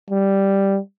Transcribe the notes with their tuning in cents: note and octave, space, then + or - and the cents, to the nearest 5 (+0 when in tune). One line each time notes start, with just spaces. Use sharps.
G3 +0